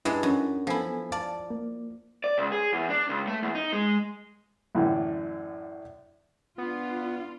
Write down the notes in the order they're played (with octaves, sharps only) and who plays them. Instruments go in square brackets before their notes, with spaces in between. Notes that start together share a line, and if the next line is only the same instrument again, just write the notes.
[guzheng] G2 G#3 [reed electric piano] E4
[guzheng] F#2
[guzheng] F3 E4 [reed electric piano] B3 A4 G#5
[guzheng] D5 [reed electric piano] F5 A5
[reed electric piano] A#3
[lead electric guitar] D5
C#2
G#4
E2
D4
C#2
A3
E2
D#4
G#3
[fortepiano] F#2 A2 D3 E3
[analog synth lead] B3 [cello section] D4 F4